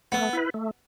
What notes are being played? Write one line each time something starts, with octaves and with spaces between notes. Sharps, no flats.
A3 B3
E4 B4
A3